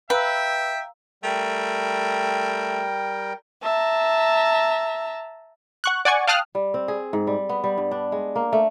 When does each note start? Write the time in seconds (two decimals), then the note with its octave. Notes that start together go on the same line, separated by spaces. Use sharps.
0.10 B4 E5 F5 G5 A#5 E6
1.23 G3 A3 A#4 G5
3.63 E5 A5 A#5
5.84 F#5 C#6 F#6
6.05 D5 F#5 G#5 C#6
6.27 F5 G5 A5 D#6 F6 F#6
6.55 G3
6.74 C4
6.88 G#4
7.13 G#2
7.27 G3
7.49 B3
7.64 G3
7.78 G2
7.91 D4
8.12 G#3
8.36 A#3
8.53 A3